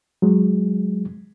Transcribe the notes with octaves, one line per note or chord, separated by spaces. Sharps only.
F#3 G#3